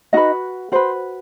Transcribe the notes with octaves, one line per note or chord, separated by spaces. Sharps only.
D#4 F#4 B4 D#5
F#4 B4 C5